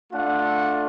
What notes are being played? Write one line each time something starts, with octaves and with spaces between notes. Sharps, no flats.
A3 D4 F4 F#5